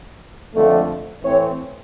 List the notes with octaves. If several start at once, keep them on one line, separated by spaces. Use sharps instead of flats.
F2 D3 F3 A3
A2 E3 A3 C4 C#5